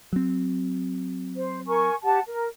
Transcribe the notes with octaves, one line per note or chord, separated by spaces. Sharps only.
F#3 C4
C5
A#4 G#5 C#6
G4 F#5 A5
A#4